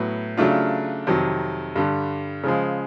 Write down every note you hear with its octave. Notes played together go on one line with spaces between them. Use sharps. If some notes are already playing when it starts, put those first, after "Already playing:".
Already playing: A2 F#3 B3
C#3 F#3 A3 D4 F4
F2 C3 D#3 F#3
G2 D3 G3
C#3 F3 G#3